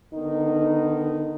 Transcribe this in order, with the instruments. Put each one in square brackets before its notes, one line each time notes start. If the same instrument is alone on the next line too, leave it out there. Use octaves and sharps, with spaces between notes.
[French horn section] D3 D#3 B3 D#4